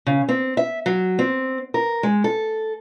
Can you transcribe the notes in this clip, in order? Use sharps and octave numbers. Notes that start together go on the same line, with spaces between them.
C#3
C4
E5
F#3
C4
A#4
G#3
A4